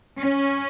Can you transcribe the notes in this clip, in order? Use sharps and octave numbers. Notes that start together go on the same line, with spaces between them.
C#4